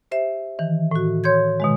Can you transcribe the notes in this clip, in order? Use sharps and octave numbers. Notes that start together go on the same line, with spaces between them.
G4 C5 E5
D#3 E3
A2 F#4
C#5 C6 G6 G#6
B2 D#3 G#3